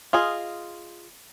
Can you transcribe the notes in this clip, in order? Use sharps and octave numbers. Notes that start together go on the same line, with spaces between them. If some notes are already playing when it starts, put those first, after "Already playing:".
F4 G#4 D#5